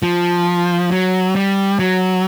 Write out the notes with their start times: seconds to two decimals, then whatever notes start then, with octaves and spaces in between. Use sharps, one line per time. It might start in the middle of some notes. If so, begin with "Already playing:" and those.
0.03 F3
0.91 F#3
1.35 G3
1.79 F#3